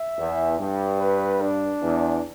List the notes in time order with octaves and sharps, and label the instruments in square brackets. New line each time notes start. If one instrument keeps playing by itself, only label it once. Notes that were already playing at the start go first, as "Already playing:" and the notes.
Already playing: [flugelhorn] E5
[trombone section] E2
G2
[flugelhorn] B4
D4
[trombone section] E2